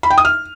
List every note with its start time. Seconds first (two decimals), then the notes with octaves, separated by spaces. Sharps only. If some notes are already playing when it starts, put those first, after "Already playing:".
0.03 B5
0.10 G5
0.18 D#6
0.25 F6